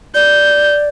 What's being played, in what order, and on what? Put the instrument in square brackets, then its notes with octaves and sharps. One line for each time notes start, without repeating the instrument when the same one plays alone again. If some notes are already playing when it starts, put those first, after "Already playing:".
[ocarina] D5 [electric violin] G6